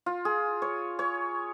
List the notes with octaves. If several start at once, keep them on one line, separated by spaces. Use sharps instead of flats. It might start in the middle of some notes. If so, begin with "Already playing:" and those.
F4
G#4
C#5
C#5